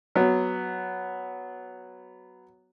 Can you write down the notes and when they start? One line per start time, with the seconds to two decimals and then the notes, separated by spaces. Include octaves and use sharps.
0.15 F#3 B3